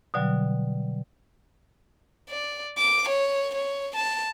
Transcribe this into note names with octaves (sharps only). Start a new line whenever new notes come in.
B2 D3 F#3 G3
D5
D6
C#5
C#5
A5